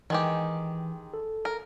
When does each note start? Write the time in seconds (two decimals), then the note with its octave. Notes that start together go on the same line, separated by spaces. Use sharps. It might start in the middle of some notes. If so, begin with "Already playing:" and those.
0.10 D#3 E3 G#3 G4
1.14 A4
1.45 A#4